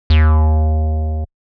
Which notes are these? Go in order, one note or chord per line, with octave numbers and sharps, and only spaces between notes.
D#2